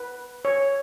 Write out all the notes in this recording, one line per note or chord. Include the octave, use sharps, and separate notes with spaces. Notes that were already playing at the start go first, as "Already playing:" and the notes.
Already playing: B4
C#5